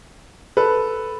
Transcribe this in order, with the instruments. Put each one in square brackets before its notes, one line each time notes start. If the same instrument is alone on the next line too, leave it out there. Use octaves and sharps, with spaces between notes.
[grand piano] A4 B4